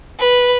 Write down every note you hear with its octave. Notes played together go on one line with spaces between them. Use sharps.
B4